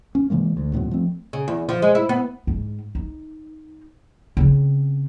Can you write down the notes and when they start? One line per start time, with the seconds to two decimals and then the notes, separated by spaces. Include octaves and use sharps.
0.15 C#4
0.30 C3 E3 G#3 A#3
0.57 D2
0.73 D#2 A2 C3 F#3
0.91 F3 A3 C4
1.33 C#3
1.48 E2
1.69 F3
1.82 G#3
1.95 E4
2.09 B3
2.47 G#2
2.95 D#4
4.37 C#3 C4